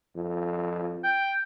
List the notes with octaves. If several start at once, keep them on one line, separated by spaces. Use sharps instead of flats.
F2
G5